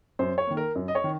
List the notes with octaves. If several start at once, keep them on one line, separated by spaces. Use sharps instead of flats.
F#2 C5
C#5
D#3 A#3
A#4
F#2
D#5
C#5
D#3